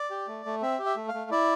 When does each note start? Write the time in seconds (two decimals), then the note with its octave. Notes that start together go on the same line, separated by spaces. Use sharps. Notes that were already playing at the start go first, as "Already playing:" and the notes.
Already playing: D5
0.10 G4
0.27 A3
0.46 A3
0.62 C4 E5
0.79 G4
0.86 E5
0.96 A3
1.08 F5
1.14 A3
1.31 E4 D5